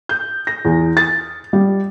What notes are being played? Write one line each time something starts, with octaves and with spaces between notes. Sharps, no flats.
G6
A#6
E2
A6
G3